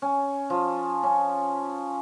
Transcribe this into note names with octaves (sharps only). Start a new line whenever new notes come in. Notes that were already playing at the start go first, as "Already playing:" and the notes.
C#4
F3
C#4